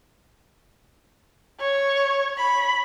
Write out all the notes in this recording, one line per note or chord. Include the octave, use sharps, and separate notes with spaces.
C#5
B5